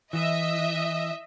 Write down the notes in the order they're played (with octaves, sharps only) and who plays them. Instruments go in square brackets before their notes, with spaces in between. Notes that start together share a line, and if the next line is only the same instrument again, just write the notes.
[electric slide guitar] E3 [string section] D#5 E5